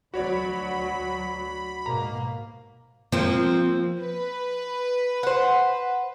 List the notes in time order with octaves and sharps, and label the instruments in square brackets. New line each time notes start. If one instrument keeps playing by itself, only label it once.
[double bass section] D2 F#3 [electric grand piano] F#4 C#5 D5 [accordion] B5
[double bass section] G#2 B2 [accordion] A#3 [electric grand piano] A#5
[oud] F3 [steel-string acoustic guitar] A#3 C4
[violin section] B4
[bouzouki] C5 F#5